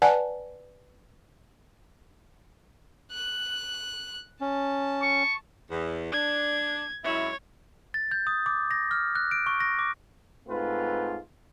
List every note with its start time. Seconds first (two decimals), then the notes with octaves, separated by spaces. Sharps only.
0.02 B4 D5 F#5 G#5 A5
3.12 F#6
4.41 C#4 A5
5.03 C#6
5.70 E2
6.12 D4 G#6
7.04 F#2 G#3 E4 C#5
7.94 A6
8.11 G6
8.27 D#6
8.46 D6
8.71 A#6
8.91 F6
9.15 F#6
9.31 D7
9.46 C#6
9.60 A#6
9.79 D6
10.48 G#2 A3 C4 F4 B4